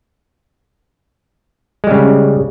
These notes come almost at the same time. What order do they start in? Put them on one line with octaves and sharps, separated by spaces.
G#3 G3 C#3